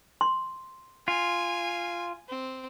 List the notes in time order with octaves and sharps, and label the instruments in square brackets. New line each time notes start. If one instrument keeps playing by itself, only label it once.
[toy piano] C6
[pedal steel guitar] F4 [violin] G#5
[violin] C4